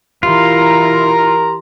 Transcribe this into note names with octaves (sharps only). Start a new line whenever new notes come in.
E3 E4 F4 G4 A#4 A#5 C6